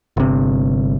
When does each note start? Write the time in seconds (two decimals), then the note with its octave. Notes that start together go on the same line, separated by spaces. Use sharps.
0.17 G1 C3